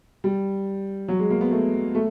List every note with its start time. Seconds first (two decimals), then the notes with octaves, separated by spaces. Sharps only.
0.24 G3
1.08 F#3
1.19 G#3
1.30 A#3
1.41 B3
1.52 A3
1.95 A3